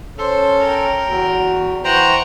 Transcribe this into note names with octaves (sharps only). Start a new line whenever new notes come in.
C#4 A4 C5
A#4 G5
E2 F#4
E3 C5 F#5 G5 A#5 C#6